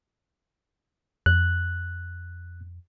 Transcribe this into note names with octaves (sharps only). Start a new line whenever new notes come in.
F2 F#6